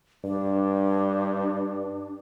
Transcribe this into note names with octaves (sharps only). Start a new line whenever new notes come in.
G2 D4